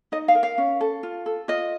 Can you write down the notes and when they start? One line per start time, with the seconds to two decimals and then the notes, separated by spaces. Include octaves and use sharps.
0.12 D#4 D#5
0.28 F5
0.35 A#4
0.43 F5
0.58 C#4
0.81 A4
1.03 F4
1.26 A4
1.48 F4 D#5